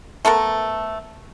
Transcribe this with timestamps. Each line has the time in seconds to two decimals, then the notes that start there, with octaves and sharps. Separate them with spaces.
0.25 A3 B3 A4 A#4